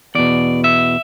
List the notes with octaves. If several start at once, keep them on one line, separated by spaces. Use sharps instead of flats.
E2 B2 D5
E5